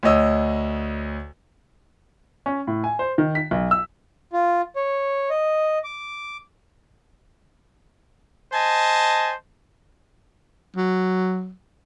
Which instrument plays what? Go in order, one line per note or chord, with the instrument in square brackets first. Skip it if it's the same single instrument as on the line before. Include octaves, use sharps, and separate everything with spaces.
[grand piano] D2 C#5 D#5 E6
C#4
A2
G#5
C5
D#3
B6
B1
E6
[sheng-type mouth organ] F4
C#5
D#5
D6
[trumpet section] C5 D#5 G#5 A5
[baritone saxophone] F#3